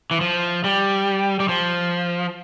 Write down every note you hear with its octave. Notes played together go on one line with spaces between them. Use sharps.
E3
F3
G3
G3
F3